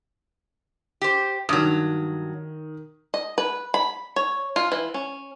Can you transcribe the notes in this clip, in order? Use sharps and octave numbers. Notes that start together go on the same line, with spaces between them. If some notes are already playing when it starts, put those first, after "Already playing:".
G4 C5
G2 D#3 F#3 D#6
D#5
B4
B5
C#5
F4
E3
C#4